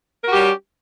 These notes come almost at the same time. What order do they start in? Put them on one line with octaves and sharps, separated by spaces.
A#4 F#4 G4 G3 C#4